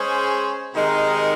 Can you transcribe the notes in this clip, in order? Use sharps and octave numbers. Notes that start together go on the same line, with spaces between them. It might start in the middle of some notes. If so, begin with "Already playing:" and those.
Already playing: G#3 C#4 G#4 C5
C3 D#3 G#3 D#4 A#4